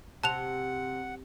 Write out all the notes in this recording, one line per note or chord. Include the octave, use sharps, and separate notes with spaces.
C3 F#5 A5 F#6 F7